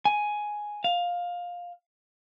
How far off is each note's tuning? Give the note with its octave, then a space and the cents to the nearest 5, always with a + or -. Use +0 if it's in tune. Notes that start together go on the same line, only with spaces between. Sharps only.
G#5 +5
F5 +15